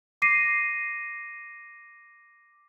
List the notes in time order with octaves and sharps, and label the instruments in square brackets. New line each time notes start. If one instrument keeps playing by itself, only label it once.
[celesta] D6 A#6 C7 D#7